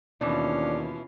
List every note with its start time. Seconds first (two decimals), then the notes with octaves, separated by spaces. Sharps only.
0.21 D#2 B2 E3 C#4 D4 F4